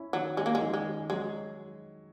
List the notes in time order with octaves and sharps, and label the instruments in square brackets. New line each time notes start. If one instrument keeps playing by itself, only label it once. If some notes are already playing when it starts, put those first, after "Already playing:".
Already playing: [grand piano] C#4 E4
[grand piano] D#3 [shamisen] F#3
[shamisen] G#3 [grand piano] C#4
[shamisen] A#3
G#3
[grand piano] D#3
[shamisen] G#3
[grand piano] C#4
[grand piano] F#3 [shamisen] G#3